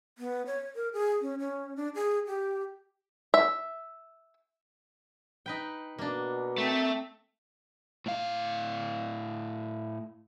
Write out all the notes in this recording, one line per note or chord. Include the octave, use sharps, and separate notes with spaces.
B3
C#5
A#4
G#4
C#4
C#4
D4
G#4
G4
E5
D#4 B4 G5
B2 A#3 D4
A3 C4
A2 F5